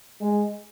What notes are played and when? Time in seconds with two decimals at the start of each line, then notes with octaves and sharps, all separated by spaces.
0.21 G#3